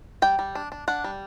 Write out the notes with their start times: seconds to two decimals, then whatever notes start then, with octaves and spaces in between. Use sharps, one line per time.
0.22 G3 G5
0.39 G3
0.55 D4
0.72 D4
0.88 D4 F#5
1.04 G3